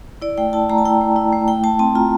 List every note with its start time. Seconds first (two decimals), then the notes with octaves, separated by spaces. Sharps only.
0.22 E4 D5
0.38 A3 G5
0.53 E4 A5
0.70 A3 A#5
0.78 A5
0.85 E4 G5
1.01 A3
1.16 E4
1.33 A3
1.48 A3 G5
1.64 A3 A5
1.79 C4 A5
1.95 F4 A#5